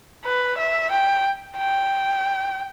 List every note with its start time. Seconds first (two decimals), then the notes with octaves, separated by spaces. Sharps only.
0.25 B4
0.58 E5
0.91 G5
1.57 G5